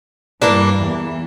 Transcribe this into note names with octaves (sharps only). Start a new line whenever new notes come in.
G2 E3 G3 A#3 D4
E2 E3